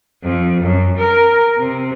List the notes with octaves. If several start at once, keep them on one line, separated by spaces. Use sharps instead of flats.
F2
F#2
A#4
C3